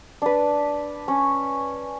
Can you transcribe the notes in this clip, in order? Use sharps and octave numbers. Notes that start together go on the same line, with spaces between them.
D4 B4
C#4